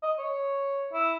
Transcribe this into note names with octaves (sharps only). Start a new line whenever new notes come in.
D#5
C#5
E4